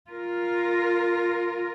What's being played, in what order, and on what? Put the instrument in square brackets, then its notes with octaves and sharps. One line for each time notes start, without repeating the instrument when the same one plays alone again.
[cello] F4 A#4